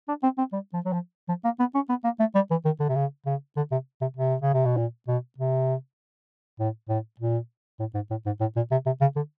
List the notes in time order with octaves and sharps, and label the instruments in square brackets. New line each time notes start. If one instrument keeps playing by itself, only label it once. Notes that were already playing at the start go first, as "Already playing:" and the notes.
[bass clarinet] D4
C4
C4
G3
F3
F#3
F3
F3
A#3
B3
C#4
B3
A#3
A3
G3
E3
D#3
D3
C3
C#3
C#3
D3
C3
C3
C3
C#3
C3
B2
A#2
B2
C3
A2
A2
A#2
A2
G#2
A2
G#2
A2
A#2
C3
C3
C#3
D3